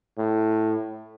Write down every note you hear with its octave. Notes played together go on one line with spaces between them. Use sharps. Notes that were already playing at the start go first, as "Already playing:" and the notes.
A2